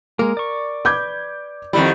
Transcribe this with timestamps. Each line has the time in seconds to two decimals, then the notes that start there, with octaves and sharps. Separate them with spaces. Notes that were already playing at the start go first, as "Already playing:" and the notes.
0.19 G#3 A#3 A#4
0.37 D5 C#6
0.85 B4 D6 G6 G#6
1.73 F2 D#3 G3 E4 F#5